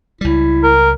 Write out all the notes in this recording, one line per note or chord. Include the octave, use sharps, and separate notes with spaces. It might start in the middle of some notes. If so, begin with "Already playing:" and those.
C#2 G3 E4
A#4